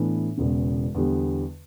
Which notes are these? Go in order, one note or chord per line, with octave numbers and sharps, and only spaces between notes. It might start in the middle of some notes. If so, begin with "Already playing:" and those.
Already playing: A2 E3 B3 D4
E1 E2 C#3
E2 D3 G3